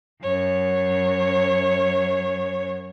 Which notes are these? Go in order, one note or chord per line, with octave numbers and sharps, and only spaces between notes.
F#2 C#5